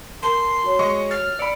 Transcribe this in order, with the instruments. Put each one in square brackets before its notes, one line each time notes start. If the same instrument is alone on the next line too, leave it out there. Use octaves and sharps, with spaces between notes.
[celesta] A#4 A5 G7 [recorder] C6
[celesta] F#4 C#5
[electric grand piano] G#3 D#5 C#6
[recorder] F6 [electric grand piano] A6
[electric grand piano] D5 B5 [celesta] E6 C#7 D7